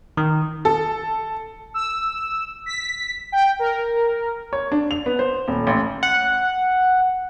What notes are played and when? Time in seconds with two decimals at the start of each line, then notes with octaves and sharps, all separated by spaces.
0.17 D#3
0.65 A4
1.74 E6
2.66 B6
3.32 G5
3.59 A#4
4.53 C#5
4.72 D4
4.91 F7
5.06 B3
5.19 C5
5.48 D#1
5.67 A1
6.03 F#5